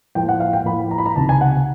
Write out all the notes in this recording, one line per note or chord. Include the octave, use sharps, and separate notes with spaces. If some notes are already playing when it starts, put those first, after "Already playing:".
A2 F3 A#3 G5
F#5
F5
G5
A2 F3 A#3 B5
A#5
B5
A#5
C#2 C3 D#3 A5
G#5
F#5